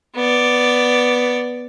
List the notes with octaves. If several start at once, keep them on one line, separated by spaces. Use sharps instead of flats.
B3 D5